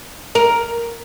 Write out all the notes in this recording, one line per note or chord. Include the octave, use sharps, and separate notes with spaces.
A#4